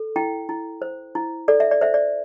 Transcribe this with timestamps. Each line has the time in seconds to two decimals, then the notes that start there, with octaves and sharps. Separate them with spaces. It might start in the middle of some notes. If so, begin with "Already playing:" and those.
Already playing: A4
0.16 E4 G5
0.49 E4
0.82 C5
1.15 E4
1.48 A4 D5
1.60 E5
1.71 D5
1.81 C5 E5
1.94 D5